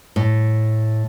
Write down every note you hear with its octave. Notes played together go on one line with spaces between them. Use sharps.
A2